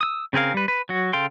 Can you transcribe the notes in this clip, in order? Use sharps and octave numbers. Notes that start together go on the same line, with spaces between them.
D#6 E6
C#3 C4 G#4 A#4 F5
G3 B4
B4
F#3 F#4
C#3 A4 F5 G5 C6